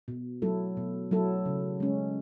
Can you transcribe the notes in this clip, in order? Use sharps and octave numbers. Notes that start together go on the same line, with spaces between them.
B2
F#3 A3 E4 A4
B2
F#3 A3 E4 A4
C#3
G#3 C#4